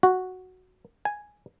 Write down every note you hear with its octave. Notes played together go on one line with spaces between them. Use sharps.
F#4
G#5